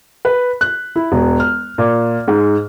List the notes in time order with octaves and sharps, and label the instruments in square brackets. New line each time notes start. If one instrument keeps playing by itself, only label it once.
[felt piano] B4
F#6
E4
E1
F6
A#2
G#2